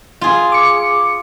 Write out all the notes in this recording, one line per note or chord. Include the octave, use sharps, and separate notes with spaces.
F4 G#4
D6 C#7